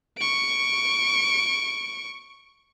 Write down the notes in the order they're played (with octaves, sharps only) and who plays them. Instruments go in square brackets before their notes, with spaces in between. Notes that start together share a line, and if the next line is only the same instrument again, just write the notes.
[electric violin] C#6 D7